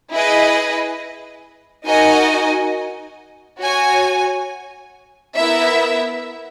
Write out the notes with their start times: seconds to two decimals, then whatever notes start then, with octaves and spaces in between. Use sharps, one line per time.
0.12 E4 G#4 B4 D#5
1.87 D#4 F#4 A#4 D#5 G#5
3.61 F#4 C#5 G#5
5.36 B3 E4 A#4 E5